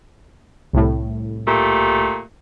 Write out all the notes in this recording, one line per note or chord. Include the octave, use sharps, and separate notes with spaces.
C2 A2
A#2 A3 G4